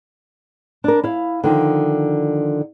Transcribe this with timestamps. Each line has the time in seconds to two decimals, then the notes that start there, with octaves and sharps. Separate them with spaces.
0.84 D4 A#4
1.04 E4 F5
1.44 D3 D#3 F3